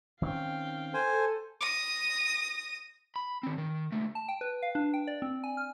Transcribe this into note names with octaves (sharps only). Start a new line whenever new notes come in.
D#3 C4 C#4 F5 G5
A4 C5 G#5
D#6 A#6
B5
D#3 C4
D#3
C#2 A3
A5
G5
B4
F5
D4
G5
D5
C4
G#5
F6